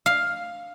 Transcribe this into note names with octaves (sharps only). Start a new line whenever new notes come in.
F5